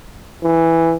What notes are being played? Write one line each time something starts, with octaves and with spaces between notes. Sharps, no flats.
E3